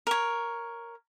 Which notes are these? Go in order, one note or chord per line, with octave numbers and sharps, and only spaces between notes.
A#4 C#5